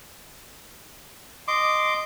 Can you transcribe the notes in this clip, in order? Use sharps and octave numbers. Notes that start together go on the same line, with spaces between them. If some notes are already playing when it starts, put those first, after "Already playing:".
D#5 C6 D6